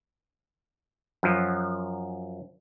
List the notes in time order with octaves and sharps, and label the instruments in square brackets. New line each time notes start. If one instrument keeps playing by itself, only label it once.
[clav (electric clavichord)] F#2 F3 F#3